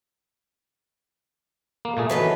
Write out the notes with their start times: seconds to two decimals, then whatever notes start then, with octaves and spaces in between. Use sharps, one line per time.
1.85 A#3
1.97 A#2 A3 G#4
2.09 D#3 E3 F#3 A4 B4